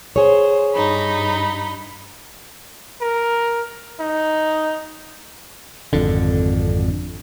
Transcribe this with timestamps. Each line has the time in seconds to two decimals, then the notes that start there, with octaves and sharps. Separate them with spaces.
0.16 G#4 C5 C#5
0.74 G2 D#4 B5
3.01 A#4
4.00 D#4
5.93 G#1 F2 D3